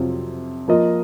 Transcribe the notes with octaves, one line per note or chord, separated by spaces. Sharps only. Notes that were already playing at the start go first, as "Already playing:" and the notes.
Already playing: F2 C3 F#3 C4 F4
F3 A#3 F4 A#4 D#5